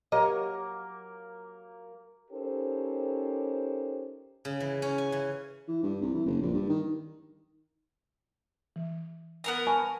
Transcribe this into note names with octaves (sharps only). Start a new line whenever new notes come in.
F#3 A#3 G4 C#5 D#5
C#4 D#4 G4 A4 A#4 C5
C#3
E3
C#4
G#5
E3
E3
G2
C2
E3
F#1
A#1
G2
D#3
E3
B3 A#4 A#5
G#5 A5 B5 C#6